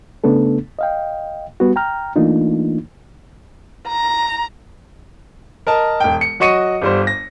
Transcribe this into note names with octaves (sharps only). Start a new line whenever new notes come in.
C#3 A3 B3 D4 A4
D#5 F5 G5
G3 B3 F#4
G5 A#5 F6
E3 A3 A#3 D4 D#4 F4
A#5
A#4 D#5 A5
E1 G5
C#7
F#3 F#4 D#5 C#6 C#7 D#7
G1 G3 C5
A#6